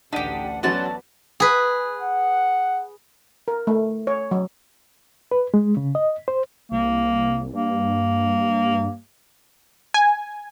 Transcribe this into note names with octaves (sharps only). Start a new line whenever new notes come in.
A1 D2 D4 D#4 G4 F#5 B6 D#7
F#3 A3 B3 C#4 F#4 D5 A5 C6
G#4 B4
F#5
A#4
A3
C#5
F#3
B4
G#3
C#3
D#5
C5
C2 A#3
G2 A#3
G#5